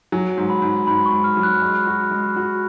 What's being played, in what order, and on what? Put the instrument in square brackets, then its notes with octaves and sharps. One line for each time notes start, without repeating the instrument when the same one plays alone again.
[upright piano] F#3 [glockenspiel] G#5
[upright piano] G#2
[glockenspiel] B5
[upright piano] G#2
[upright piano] G#2 [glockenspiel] B5
[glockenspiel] C#6
[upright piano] G#2
[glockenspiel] F6
[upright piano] F#3
[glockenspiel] F#6
[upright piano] G#3
F#4
G#3
F#4